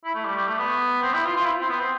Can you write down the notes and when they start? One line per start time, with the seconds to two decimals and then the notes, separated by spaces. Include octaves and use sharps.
0.04 E4
0.15 A3
0.26 G3
0.36 G3
0.48 A3
0.58 B3
1.03 C4
1.14 E4
1.25 F4
1.36 F4
1.44 E4
1.60 C4
1.69 B3
1.80 C4